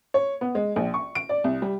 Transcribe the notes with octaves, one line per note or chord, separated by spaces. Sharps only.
C#5
B3
G#3
A#1
C#6
D7
D5
C2
G3